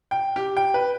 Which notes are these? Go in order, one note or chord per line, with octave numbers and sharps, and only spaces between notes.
G5
G4
G5
B4